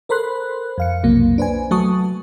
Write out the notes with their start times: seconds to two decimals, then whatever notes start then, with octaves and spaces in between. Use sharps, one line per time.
0.09 A4 A#4 C5 B5 C6 F#6
0.78 F2 F5 C#7
1.03 B1 F2 C3 F#3 A#3
1.38 D4 B4 C5 G#5
1.71 F#3 A3 F#4 A5 C#6 D#6